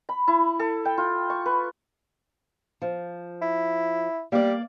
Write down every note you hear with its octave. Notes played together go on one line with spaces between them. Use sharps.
B5
E4
A4
G5
F4
C#6
B4
F3
E4
G3 A#3 D5